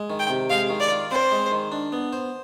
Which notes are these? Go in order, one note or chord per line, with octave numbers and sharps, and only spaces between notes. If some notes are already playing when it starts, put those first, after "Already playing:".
Already playing: G#3
D#3
G5
C3
G#3 F5
D#3
D5
F4
C4 C5
G#3
D#3
D4
B3
C5